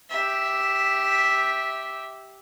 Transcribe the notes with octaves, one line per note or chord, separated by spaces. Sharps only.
G4 E5